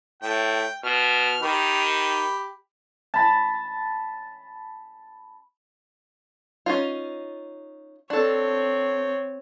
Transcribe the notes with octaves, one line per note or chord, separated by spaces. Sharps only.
A2 G5
B2 F6
D#3 G4 B5
A5 B5
C#4 D#4 F4
C4 D4 A4 C#5